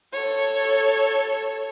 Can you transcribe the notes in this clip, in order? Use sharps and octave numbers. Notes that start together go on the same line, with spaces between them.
A4 C#5